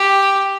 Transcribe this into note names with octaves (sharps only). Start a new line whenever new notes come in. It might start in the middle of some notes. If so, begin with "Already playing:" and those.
Already playing: G4